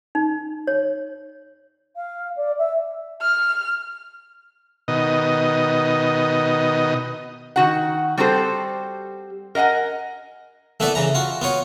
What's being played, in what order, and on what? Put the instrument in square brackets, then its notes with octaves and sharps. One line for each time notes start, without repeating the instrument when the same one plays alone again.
[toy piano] D#4
C#5
[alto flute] F5
D5
E5
[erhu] F6
[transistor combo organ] B2 D#3 D#5
[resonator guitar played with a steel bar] D#3 F#4 F#5
G3 C4 F#4 G4 A4 C5
A#4 D#5 F5 F#5 G#5
[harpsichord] A3 B3 E4 B4 D5
C#3 E3 A#5
F4 F#4
B3 F4 C#5